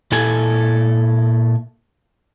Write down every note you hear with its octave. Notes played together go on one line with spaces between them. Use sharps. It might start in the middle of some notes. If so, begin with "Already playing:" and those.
A#2 E4 A4 G#5